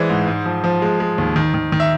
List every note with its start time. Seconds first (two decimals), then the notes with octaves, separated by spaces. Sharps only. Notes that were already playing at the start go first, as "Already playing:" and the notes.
Already playing: E3 G#3 C5 D5
0.09 G#2
0.27 G#2
0.45 F3
0.64 F3
0.82 G#3
1.00 G#3
1.18 D#2
1.36 D#3
1.54 D#3
1.72 D#3
1.80 E5